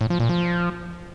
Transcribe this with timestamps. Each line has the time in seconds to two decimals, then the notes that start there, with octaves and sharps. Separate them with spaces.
0.01 A2
0.10 F3
0.20 A#2
0.29 F3